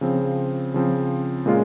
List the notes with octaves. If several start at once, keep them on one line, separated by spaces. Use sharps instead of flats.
C#3 F3 C4
C#3 F3 C4
A#2 G#3 C#4 F4